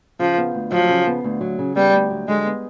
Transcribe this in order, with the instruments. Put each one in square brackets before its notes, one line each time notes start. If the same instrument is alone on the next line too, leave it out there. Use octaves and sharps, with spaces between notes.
[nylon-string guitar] C#3 [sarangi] F3
[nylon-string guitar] B3
D2
[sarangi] F3 [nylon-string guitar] F#3
[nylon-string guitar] C#3
B3
D2
F#3
C#3
[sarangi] G3 [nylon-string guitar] B3
[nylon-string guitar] D2
F#3
[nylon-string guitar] D3 [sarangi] G#3
[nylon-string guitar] B3